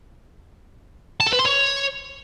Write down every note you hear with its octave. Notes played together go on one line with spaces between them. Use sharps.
A5
A4
B4
C6
C#5